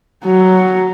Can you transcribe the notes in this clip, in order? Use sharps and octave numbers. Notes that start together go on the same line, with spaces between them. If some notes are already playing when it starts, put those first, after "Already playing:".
F#3